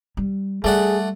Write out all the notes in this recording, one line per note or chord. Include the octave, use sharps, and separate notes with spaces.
G3
G3 A3 G#4 D5 F#5